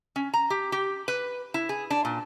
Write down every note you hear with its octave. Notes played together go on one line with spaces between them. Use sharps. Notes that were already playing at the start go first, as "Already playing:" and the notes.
C#4
A#5
G4
G4
B4
E4
G#4
D4
A#2